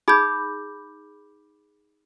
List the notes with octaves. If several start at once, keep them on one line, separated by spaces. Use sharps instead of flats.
D#4 G#4 B5 D6 G6